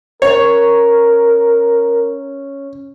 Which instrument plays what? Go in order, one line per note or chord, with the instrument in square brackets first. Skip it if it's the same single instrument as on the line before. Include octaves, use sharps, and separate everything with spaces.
[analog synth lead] C#4 [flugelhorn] A#4 [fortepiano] C#5